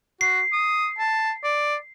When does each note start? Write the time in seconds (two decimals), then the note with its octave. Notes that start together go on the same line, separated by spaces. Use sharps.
0.21 F#4 C7
0.53 D#6
0.99 A5
1.44 D5